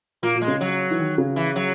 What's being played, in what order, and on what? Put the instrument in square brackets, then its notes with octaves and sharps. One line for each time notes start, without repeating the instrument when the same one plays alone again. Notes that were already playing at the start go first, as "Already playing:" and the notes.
[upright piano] A#2 [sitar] A#3
[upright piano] A#2
[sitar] G#3
[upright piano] C#3
[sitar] F#3
[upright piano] E3
D#3
C#3
[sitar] E3
F#3